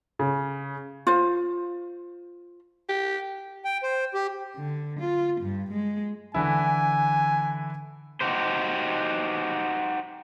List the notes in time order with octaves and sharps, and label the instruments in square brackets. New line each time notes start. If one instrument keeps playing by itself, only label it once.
[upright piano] C#3
[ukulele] F4 C5
[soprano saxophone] G4
[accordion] G5
C5
G4
[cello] D3
F4
G2
G#3
[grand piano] D3 E3 E4 [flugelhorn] G#5
[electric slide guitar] D#4 F#4 G4 C5